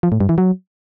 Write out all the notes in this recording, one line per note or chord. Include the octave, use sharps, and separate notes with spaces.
F3
A2
G2
E3
F#3